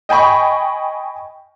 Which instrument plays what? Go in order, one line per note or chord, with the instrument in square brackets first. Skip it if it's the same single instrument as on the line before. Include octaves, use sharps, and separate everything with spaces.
[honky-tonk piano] D#5 G5 G#5 B5 C#6